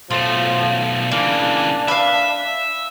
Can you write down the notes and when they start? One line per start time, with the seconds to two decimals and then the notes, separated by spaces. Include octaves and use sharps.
0.11 B1 F3 A3 F4
1.11 C#3 E3 A#3 D4
1.88 B4 E5 F5